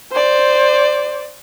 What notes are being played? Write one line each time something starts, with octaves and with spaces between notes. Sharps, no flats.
C5 D5